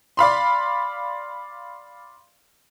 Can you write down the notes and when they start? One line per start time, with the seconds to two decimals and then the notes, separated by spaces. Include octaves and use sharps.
0.17 D5 F5 B5 C6